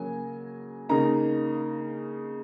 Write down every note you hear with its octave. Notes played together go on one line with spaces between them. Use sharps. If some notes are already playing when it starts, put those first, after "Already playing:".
Already playing: C#3 F#3 A#3 G#5
C#3 A#3 D#4 A#5